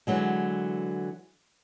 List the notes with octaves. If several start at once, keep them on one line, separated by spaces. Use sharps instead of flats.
D3 E3 F#3 G#3